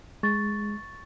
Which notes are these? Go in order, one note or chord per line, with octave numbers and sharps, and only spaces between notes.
G#3 C#6 A6